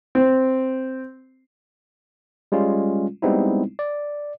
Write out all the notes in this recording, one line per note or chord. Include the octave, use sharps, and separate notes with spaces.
C4
G3 G#3 C#4 F4
G3 G#3 B3 C4 D#4 E4
D5